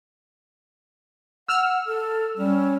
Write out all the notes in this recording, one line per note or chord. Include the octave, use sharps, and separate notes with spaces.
F#5 E6 F6
A4
G3 C#4